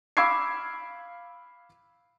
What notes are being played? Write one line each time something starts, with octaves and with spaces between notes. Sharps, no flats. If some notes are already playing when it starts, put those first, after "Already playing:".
F5 B5 D6 E6 G#6 C7